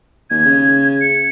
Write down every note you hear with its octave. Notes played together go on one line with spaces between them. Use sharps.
D#2 G#6
C#3
C#7